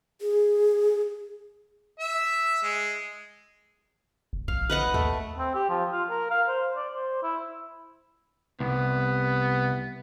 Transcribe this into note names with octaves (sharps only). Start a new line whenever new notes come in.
G#4
E5
G#3
E1
A#1 F5
B4 D#5 F#5
D#2 A3
C4
G4
F3
F4
A#4
F5
C5
D5
C5
E4
C2 B3